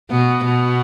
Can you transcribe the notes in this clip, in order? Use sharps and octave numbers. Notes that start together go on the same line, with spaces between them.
B2 B3
B2 B3